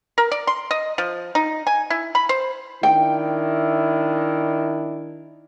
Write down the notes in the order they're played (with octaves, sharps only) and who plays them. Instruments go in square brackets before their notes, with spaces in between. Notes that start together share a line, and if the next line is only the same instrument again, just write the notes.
[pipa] A#4
D5
C6
D#5
F3
D#4
G#5
E4
B5
C5
[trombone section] D#3 D4 E4 [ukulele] G5